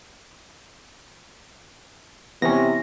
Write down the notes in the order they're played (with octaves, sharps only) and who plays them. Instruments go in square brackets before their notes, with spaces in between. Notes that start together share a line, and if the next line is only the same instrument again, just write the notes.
[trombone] C3 [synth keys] E3 C#4 [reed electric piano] B3 [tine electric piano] A#6